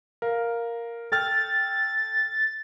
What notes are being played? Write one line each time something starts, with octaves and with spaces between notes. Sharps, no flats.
A#4 F5
A4 G5 F6 A6